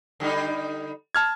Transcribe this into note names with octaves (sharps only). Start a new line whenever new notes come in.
D3 G3 D#4
A5 F6 G#6